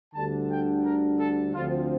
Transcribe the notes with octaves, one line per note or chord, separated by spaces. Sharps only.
D2 D3 G3 D4 A5
G5
A#4
A4
D2 D3 F3 C4 F4